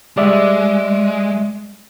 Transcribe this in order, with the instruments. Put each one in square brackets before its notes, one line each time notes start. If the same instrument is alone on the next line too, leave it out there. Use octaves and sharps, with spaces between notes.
[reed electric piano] G3 D5 E5 [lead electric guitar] G#3